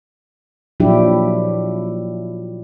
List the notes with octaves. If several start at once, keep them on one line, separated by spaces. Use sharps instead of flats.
A#2 F3 F#3 D4 E4 G4